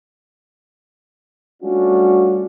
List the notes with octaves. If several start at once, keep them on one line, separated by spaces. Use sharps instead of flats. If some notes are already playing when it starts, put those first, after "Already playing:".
G3 A3 C#4 D4 F4 F#4